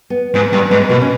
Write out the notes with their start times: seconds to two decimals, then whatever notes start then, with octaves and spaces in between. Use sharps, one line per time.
0.10 B3
0.34 G#2 B3
0.53 G2 B3
0.71 G#2 B3
0.89 B2 A#3
1.02 C#4